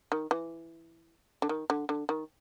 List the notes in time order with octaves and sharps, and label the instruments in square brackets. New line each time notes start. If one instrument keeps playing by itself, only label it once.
[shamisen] D#3
E3
D3
D#3
D3
D3
D#3